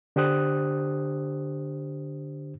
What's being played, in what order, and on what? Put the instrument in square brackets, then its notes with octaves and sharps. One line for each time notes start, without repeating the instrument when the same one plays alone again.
[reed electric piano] D3 D4 G4 C5 D#6 F#6